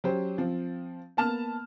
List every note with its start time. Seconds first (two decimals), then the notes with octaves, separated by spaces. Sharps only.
0.04 F#3 C#4 G4 C5
0.38 F3 C4
1.17 A#3 B3 A5 F6 E7